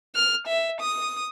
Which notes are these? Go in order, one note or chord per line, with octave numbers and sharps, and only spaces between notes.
F6
E5
D#6